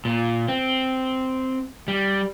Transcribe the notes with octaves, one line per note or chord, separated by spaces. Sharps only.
A#2
C4
G3